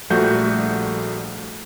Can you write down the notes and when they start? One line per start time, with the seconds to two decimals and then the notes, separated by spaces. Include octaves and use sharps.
0.10 A#1 F3 G3 A3 F#4 G6